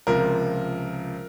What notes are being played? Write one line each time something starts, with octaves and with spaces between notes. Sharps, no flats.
C#2 C3 F3 A#4